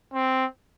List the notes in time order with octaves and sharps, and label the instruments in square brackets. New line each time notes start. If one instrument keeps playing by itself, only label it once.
[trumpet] C4